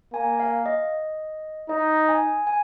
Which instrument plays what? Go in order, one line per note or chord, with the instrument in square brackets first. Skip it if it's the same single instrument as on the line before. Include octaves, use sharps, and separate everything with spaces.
[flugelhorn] A#3 [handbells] G#5
[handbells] F5
D#5
[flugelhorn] D#4 [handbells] D#5
[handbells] G#5
G#5